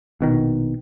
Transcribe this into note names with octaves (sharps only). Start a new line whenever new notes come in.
A#1 B2 D#3